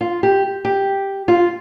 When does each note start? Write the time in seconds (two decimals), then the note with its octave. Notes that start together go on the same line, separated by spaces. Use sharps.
0.01 F4
0.23 G4
0.65 G4
1.28 F4